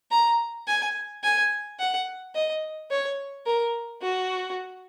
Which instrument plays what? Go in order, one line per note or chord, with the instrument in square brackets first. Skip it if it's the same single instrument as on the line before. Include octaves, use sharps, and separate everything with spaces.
[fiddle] A#5
G#5
G#5
F#5
D#5
C#5
A#4
F#4